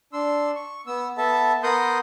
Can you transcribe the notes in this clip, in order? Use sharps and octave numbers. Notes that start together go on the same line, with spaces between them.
D4 C6 E6
C#6
B3 E6
B3 A4 E5 A5
B3 A#4 F#5 C6 D#6 G6